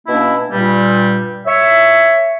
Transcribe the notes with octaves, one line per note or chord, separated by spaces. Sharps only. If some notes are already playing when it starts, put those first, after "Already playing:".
B2 A#3 C#4 D4 E4
G2 A#2 G3
C#5 E5